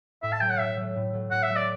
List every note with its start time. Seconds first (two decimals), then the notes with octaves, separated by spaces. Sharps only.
0.22 A2 E5
0.33 A5
0.41 F#3 A3 G5
0.50 F#5
0.59 A2 E5
0.77 F#3 A3
0.96 A2
1.13 F#3 A3
1.31 A2 F#5
1.43 E5
1.49 F#3 A3
1.56 D5